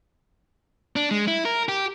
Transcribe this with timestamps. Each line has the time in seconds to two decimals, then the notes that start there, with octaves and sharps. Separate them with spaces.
0.96 D4
1.11 G#3
1.27 E4
1.45 A#4
1.69 G4